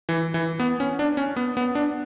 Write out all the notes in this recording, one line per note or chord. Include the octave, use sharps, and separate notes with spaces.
E3
E3
B3
C#4
D4
C#4
B3
B3
D4